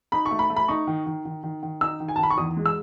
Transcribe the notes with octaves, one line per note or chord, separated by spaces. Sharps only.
D#4 B5
C#6
A3
B5
A3
B5
D#4 C#6
D#3
D#3
D#3
D#3
D#3
D#4 E6
D#3
G#5
A5
D#3 B5
C#6
E2 D#6
G#3
E6